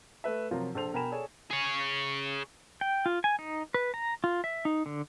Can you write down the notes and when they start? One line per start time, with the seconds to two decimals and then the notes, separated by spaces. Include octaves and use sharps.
0.24 A3 B4 E5
0.51 C3 F3 F#3 F4 A#4
0.75 A#1 A4 C5 F7
0.94 B2 A#4 G5 G#5 B5 E7
1.12 G#4 A4 C#5 D5 G#5
1.51 G#4 C#5
2.81 G5
3.06 F4
3.24 G#5
3.39 D#4
3.74 B4
3.94 A#5
4.24 F4
4.44 E5
4.65 D#4
4.86 D3